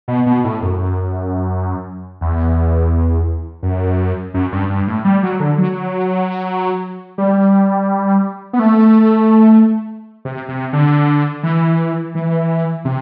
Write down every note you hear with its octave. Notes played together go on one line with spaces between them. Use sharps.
B2
B2
A2
F#2
E2
F#2
F#2
G2
G2
A2
G3
F#3
D3
F#3
G3
B3
A3
C3
C3
D3
E3
E3
C3